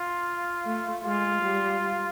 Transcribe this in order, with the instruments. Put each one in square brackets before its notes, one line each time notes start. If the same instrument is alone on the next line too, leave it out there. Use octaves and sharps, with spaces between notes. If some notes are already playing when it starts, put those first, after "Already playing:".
Already playing: [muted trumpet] F4
[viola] A3
[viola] G#3 [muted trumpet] F4
[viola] G3